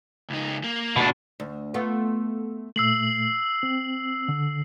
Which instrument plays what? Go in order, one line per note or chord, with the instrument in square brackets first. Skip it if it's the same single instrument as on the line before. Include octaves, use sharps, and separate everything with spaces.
[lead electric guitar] C#2 D#4
A#3
[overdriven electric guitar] B2 D4
[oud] D2
A3 B3 F4
[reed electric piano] A#2 A3 [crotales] E6 C7 F#7
[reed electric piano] C4
D3